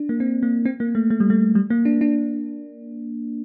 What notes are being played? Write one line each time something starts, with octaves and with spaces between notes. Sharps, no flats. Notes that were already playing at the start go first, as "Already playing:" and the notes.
Already playing: D4
A#3
C4
A#3
C4
A#3
A3
A3
G3
A3
G3
A#3
D4
D4